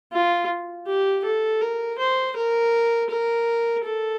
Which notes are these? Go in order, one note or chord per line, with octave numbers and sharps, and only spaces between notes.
F4
G4
A4
A#4
C5
A#4
A#4
A4